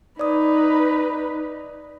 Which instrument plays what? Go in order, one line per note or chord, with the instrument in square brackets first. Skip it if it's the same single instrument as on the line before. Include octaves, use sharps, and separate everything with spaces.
[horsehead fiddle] D#4 B4 [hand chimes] D5 D#6